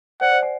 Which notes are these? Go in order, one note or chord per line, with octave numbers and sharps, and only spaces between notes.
C5 D5 F#5
C5 D5
F#5 G#5